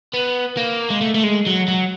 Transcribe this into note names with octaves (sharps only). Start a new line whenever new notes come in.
B3
A#3
G#3
A3
A3
G#3
F#3
F#3